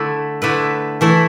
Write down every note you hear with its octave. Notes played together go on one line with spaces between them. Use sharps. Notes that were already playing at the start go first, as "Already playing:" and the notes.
Already playing: D3 A3 E4
D3 A3 E4 B4
E3 A3 E4